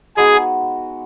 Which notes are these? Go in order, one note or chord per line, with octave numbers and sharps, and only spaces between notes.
G#3 B3 D#4 F#4 G#4